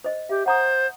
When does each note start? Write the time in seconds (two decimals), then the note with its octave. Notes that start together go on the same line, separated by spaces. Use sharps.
0.04 C5 D#5
0.29 G4 E5
0.46 C5 F#5 A#5 D#6